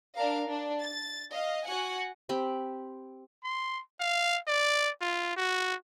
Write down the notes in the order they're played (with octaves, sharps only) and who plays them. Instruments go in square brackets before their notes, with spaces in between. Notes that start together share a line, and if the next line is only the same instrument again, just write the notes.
[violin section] D4 A#4 F5
D4
A6
D#5 F5
F#4 F#5 G#5
[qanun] C4 G4 B5
[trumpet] C6
F5
D5
F4
F#4